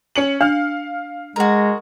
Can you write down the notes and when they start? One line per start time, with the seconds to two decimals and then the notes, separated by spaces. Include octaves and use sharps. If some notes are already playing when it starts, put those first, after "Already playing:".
0.16 C#4 C#7 F#7
0.41 D4 F5 F6
1.36 G#3 F#4 A#4